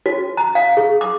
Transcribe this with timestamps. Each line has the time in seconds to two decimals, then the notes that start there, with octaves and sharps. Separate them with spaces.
0.06 F#4
0.37 A#5
0.55 F5
0.77 G#4
1.01 D6